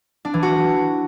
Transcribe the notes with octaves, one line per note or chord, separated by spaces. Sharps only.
D4
E3
F#4